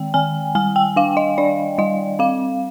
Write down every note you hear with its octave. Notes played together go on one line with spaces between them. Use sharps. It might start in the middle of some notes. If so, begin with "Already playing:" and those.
Already playing: D#3 G#3 G5
D#3 G#5
G3 G#5
G5
D4 F5
D#5
D4 D5
G3 D#5
C4 F5